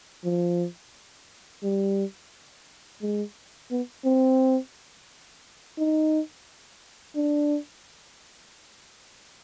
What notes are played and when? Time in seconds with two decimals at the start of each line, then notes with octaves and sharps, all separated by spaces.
0.24 F3
1.63 G3
3.01 G#3
3.71 B3
4.05 C4
5.78 D#4
7.16 D4